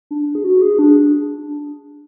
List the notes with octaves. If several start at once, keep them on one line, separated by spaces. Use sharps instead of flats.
D4
G#4
F#4
G#4
D4